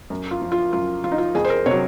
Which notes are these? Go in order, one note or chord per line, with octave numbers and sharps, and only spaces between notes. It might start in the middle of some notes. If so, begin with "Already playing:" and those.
F#2
F4
F3
F4
F#2 F4
F3 F4
D#4
F4
F2 G#4
C5
A#4
C3 F#3 C#5